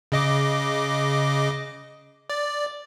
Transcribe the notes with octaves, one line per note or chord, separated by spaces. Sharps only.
C#3 D#5 D6
D5